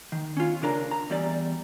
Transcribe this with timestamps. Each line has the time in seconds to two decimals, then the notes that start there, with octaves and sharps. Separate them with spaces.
0.12 D#3
0.37 C#4 F4
0.62 C#3 D4 A#4 A#5
0.91 A#5
1.10 E2 G3 D5